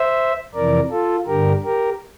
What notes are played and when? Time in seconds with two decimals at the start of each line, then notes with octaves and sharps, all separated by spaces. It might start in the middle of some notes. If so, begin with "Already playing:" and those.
Already playing: C5 E5
0.55 F2 C3 E3 A#4 D5
0.91 F4 A4
1.27 G2 D3 G4 A#4
1.64 G4 A#4